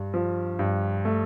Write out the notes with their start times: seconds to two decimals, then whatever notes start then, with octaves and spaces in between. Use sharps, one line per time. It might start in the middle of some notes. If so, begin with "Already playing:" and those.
Already playing: G2
0.14 F3
0.59 G2
1.05 A3